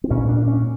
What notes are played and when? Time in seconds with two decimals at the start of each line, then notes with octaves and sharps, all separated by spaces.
0.04 C4
0.10 A#2 C#4
0.29 D4
0.48 C#4